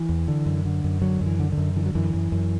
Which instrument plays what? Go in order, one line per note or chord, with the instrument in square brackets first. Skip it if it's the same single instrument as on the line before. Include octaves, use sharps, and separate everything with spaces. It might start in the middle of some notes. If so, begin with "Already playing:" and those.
Already playing: [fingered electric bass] E3
E2
D3
F#2
D3
F#2
D3 F#3
F#2
E3
D3
D3
F#2
D3 E3
F#3
F#2 E3
F#2
F#2